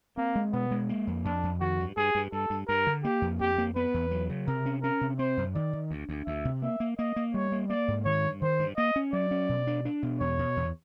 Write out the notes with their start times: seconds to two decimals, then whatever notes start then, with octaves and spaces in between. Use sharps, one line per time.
0.17 A#3 C4
0.36 G#3
0.53 B2 B3
0.71 G#3
0.89 A#3
1.07 F2
1.25 F2 D4
1.43 F2
1.60 D#3 F#4
1.79 G2
1.97 G2 G#4
2.15 G2
2.32 G2 A4
2.50 G2
2.68 G2 A#4
2.87 D3
3.04 A#3 G4
3.22 F2
3.40 F2 G4
3.58 A#3
3.76 B3 B4
3.94 E2
4.11 F#3
4.30 C#3
4.47 C3 A#4
4.66 C#4
4.83 C#4 A#4
5.01 C3
5.19 C4 C5
5.37 F#2
5.55 D#3 D5
5.73 D#3
5.91 D2
6.09 D2
6.26 D2 E5
6.45 C3
6.62 A#3 E5
6.80 A#3
6.98 A#3 D#5
7.16 A#3
7.34 G3 C#5
7.52 A#3
7.70 A#3 D5
7.88 G#2
8.05 D#3 C#5
8.24 G2
8.42 D#3 C5
8.59 G2
8.77 A#3 D#5
8.96 C#4
9.13 F#3 D5
9.31 C#4
9.49 B2
9.67 D4
9.85 D4
10.03 B2
10.20 E2 C#5
10.39 B2
10.57 E2